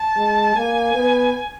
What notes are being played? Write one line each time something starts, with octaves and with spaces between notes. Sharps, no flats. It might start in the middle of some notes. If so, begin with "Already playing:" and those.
Already playing: A5
G#3
A#3 G#5
B3